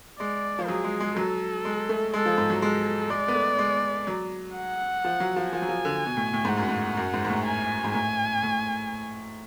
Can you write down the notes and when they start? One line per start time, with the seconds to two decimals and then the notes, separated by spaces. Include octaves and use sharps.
0.19 G#3 D5
0.59 F3
0.68 F#3 G#4
0.84 G#3
1.00 G#3
1.17 F#3 A4
1.65 G#3
1.89 A3
2.14 G#3 A4
2.26 F3
2.38 G#2
2.50 F#3
2.62 G#3 A4
3.10 G#3 D5
3.28 B3
3.34 A3
3.58 G#3
4.07 F#3
4.56 F#5
5.04 F3
5.20 F#3
5.36 F3
5.52 F3 G#5
5.62 F#3
5.68 F3
5.85 D3
6.06 B2
6.17 A2
6.33 A2
6.45 G#2 F#5
6.57 F#2
6.69 G#2
6.97 F#2
7.14 G#2
7.25 G#2
7.30 A2
7.46 G#5
7.84 G#2
7.94 A2 G#5
8.43 A2